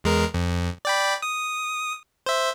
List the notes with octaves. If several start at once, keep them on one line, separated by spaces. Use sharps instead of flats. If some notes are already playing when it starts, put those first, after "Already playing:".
E2 G#3 A#4
F2
D5 G5 B5
D#6
C5 E5